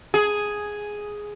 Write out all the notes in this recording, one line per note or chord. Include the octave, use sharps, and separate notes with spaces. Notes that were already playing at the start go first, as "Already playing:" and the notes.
G#4